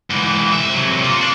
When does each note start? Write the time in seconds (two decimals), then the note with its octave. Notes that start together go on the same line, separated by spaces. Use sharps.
0.10 G#2 E3
0.52 C2 E5
0.74 C3 F#3
1.03 A#3 F4
1.21 D4